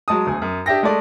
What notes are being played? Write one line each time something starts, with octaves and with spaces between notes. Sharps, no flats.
F#3 G#3 A5 D#6
E1 D2 G#5
F#2
D4 G4 E5 G5 A#6
G#3 A3 A4 D5